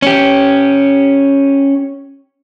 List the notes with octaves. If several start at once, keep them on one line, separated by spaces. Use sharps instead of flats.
C#4 G4